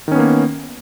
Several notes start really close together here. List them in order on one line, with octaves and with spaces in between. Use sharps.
D#3 C#4 B3 A#3